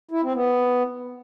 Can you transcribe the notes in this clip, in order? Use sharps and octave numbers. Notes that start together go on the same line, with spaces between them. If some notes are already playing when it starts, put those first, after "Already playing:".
E4
C4
B3